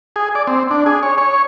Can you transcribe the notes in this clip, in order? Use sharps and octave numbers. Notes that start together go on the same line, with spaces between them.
G#4
D5
C4
D4
G#4
C#5
C#5